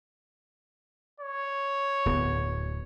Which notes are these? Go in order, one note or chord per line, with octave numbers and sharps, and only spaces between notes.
C#5
D1 B3